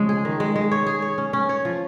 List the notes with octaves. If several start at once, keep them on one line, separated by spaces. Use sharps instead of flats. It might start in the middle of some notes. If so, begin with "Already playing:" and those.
Already playing: C#3 F3 G#3 C#4
G#4
D#3
G#3
G#3
C#5
G#4
C#5
C#4
C#4
C#5
F3